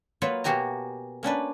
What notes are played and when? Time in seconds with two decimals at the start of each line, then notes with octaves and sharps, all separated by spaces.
0.22 F#3 A#3 F4 B4 C#5
0.44 B2 A#3 F#4 G4 G#5 A#5
1.23 A#3 C#4 D4 B4